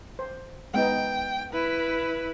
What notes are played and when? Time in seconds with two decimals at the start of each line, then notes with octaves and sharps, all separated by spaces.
0.19 C5
0.74 G#3 B3 D#4 G5
1.53 E4 B4